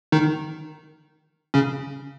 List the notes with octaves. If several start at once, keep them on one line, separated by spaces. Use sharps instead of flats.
D#3 D#4
C#3 C#4